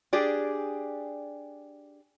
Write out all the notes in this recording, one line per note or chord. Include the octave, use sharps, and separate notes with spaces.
D4 G4 G#4 D5